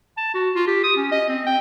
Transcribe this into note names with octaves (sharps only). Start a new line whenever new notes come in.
A5
F#4
F4
G4
D#6
C#4
D#5
C4
G5